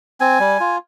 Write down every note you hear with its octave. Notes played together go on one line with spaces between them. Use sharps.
C4 G#5
G3
F4